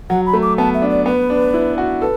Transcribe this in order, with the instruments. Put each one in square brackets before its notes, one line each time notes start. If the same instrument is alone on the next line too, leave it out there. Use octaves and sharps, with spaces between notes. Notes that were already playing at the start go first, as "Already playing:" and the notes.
[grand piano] F#3 [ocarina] F#5
[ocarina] B5
[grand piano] A3
[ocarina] D6
[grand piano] B3 [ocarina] A5
[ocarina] E5
[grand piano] D4
[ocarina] D5
[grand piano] B3 [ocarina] B4
[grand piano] D4
E4
F#4
[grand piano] A4 [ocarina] B4